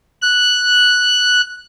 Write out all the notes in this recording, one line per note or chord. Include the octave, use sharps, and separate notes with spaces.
F#6